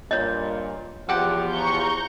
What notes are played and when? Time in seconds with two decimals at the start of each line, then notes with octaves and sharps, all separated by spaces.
0.11 G2 A#2 C#5 D#5
1.09 E2 F3 G4 F#5
1.50 A#5 C#6 G6